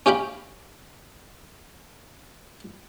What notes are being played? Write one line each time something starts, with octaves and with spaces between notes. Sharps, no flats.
C#4 G4 F5 G5 B5